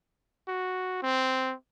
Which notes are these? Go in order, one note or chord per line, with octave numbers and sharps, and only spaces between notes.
F#4
C4